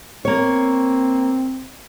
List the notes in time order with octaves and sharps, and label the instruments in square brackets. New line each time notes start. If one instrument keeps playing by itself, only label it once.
[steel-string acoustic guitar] A#3 C#5 [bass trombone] C4